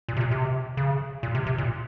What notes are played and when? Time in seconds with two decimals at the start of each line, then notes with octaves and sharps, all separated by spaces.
0.08 A#2
0.17 C3
0.21 A#2
0.31 C3
0.77 C#3
1.23 A#2
1.35 C3
1.46 C3
1.58 A#2